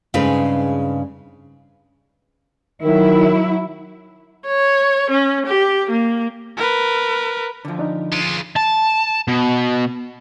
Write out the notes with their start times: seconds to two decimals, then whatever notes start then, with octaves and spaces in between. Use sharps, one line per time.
0.14 G2 C#3 G#3 C4 D#4 B4
2.83 D#3 F#3 E4
4.47 C#5
5.10 C#4
5.46 G4
5.90 A#3
6.57 A#4 B4
7.65 D3 F3
7.79 D4 D#4
8.12 G#3 F4
8.56 A5
9.28 B2